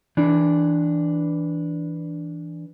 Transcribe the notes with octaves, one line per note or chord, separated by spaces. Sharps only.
E3 D4